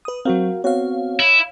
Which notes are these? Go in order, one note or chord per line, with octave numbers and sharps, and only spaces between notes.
B4 D#6
F#3 C4 F#4 A#4 F5
B3 C4 F#4 C#5 F5
E4